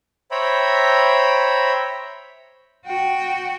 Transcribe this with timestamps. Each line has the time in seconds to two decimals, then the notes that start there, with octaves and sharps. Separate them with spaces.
0.31 C5 C#5 E5 G5 A#5 B5
2.86 F#4 G5